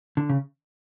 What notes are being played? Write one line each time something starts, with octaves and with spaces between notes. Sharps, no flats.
D3
C#3